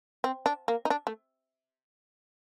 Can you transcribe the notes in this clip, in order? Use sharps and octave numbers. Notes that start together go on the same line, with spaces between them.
C4
D4
A#3
D#4
D4
A3